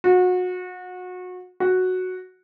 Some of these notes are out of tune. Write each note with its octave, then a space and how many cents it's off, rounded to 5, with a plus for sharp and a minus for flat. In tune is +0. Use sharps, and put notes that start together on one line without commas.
F#4 -30
F#4 -5